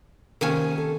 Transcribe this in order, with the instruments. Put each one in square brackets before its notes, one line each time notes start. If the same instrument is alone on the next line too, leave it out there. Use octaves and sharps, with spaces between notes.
[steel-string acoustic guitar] C3 A#3 [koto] D#3 C#4 G#5
[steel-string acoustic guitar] A4